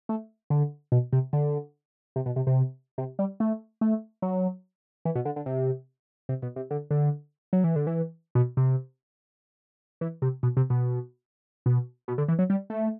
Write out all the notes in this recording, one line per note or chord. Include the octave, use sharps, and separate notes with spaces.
A3
D3
B2
C3
D3
C3
B2
C3
C3
C3
G3
A3
A3
F#3
E3
B2
D3
D3
C3
C3
B2
C3
D3
D3
F#3
E3
D3
E3
B2
C3
E3
C3
B2
C3
B2
B2
B2
D3
E3
F#3
G3
A3